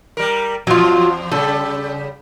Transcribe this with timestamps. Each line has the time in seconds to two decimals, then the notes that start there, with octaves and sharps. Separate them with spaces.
0.17 G3 A#4
0.67 E2 F3 F#3 F4
1.31 C#3 G3 A4